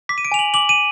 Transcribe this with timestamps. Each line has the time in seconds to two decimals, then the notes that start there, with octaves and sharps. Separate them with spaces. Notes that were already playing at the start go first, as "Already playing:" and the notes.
0.09 D6 B6
0.18 D#7
0.25 D7
0.32 G#5 F7
0.39 F#7
0.54 D6 F#7
0.69 D#7